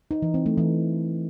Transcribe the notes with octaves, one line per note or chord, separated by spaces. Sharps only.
D#4
E3
C4
A3
E3